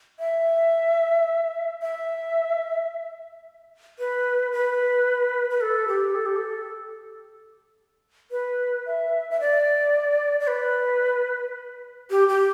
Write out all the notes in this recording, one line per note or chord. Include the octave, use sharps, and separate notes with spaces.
E5
E5
B4
B4
B4
A4
G4
A4
G4
A4
B4
E5
E5
D5
D5
B4
G4
G4